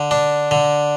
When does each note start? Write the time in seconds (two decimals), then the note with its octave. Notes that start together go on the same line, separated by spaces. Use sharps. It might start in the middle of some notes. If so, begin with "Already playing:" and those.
Already playing: D3
0.11 D4
0.51 D3